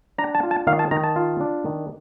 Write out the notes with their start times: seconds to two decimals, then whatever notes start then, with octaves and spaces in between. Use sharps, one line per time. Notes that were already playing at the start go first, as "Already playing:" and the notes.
0.18 D4 A#5
0.35 A5
0.43 F4
0.51 A5
0.67 D#3 F5
0.79 A5
0.91 D#3 A#5
1.04 A5
1.16 F4
1.41 D4
1.65 D#3